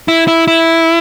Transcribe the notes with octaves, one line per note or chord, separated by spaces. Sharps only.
E4
E4
E4